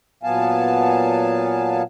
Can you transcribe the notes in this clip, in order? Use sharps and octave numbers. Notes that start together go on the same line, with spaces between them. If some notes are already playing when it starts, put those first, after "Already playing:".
A#2 F#3 B3 F5 G#5 A5